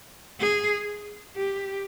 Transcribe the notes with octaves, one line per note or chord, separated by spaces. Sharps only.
G#4
G4